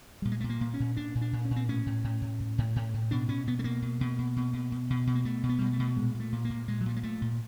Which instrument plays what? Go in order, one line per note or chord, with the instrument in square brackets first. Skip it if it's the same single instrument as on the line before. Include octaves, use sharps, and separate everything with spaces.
[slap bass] A#2 G3
G#3
A#2 A3
A#3
A#2
C#4
A#2
A#2 D4
A#2
D4
A#2
C#4
A#2
C4
A2 C#4
A2
A2
A2
A2
A2
A2
A2
B2 D4
B2 C#4
B2 B3
A3
B2 A#3
B2
B2
B2
B2
B2
B2
B2
B2
A#3
B2 A3
B2
B3
G3
B2 G#3
A3
B2
A#2 G#3
A#2
A3
A#2
A#3
A#2
A#2 G#3
F#3
A#2 G3
G#3
A#2 A3
A#2